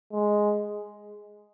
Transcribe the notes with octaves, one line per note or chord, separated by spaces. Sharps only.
G#3